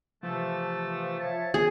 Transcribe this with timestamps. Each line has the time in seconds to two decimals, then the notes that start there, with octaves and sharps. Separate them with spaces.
0.23 C3 E3 F3 A3
1.19 C#5 E5 A5
1.54 G#4